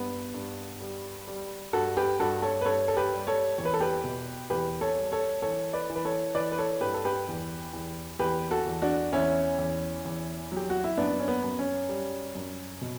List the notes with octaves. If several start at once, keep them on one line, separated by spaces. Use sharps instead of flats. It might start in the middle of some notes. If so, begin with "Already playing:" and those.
Already playing: G2 B3
G2
G3
G3
G2 F#4 A4
G4 B4
G2 F#4 A4
A4 C#5
B4
G2 A4 C#5
A4
G4 B4
G3
A4 C#5
E2 C#5
B4
A4
G4 B4
B2
E2 G4 B4
A4 C#5
G3
A4 C#5
E3 A4 C#5
B4 D5
E3
B4
A4 C#5
E3 B4 D5
B4
A4 C#5
G2 G4 B4
A4
G4 B4
E2
E2
E2 G4 B4
F#4 A4
E2
D4 F#4
E2 C#4 E4
E2
E2
F#3 G4
F#4
E4
F#2 B3 D4
C#4
B3
F#2
C#4
G3
F#2
B2